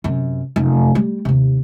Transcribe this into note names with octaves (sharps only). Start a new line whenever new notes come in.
F#2 C3
F1 F#2
G3
D#2 C3